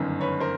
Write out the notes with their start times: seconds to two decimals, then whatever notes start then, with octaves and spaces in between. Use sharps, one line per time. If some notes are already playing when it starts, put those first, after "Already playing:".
Already playing: G1 F#2 D#3
0.21 B4 C#5
0.40 A#4 C5